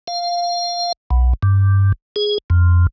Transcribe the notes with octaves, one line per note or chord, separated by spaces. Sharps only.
F5
B1
G2
G#4
F2